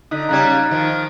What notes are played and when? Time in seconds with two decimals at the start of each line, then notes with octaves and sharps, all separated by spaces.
0.11 D3 D#4 D#6 F#6 B6
0.29 C#3 G3 C#4 A#5 F#6 G#6
0.71 D#3 F3 F4